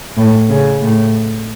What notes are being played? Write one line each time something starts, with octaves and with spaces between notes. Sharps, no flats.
A2
C#3
A2